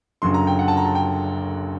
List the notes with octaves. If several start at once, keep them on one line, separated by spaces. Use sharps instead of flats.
F#1 F#2 D3 F#3 C6
A#5
G5
F#5
A5
A#5
A5
G5